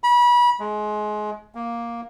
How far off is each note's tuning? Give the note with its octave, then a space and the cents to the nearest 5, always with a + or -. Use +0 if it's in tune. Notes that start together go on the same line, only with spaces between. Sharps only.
B5 -30
G#3 +25
A#3 +5